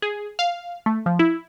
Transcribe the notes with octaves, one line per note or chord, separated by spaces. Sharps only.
G#4
F5
A3
F3
E4